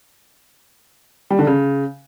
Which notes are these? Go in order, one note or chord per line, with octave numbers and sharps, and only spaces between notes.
G3
D3
C#3